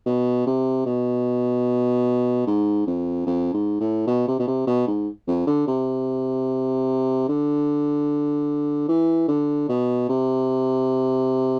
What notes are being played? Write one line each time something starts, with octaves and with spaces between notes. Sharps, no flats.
B2
C3
B2
G#2
F2
F2
G#2
A2
B2
C3
B2
C3
B2
G#2
F2
D3
C3
D3
E3
D3
B2
C3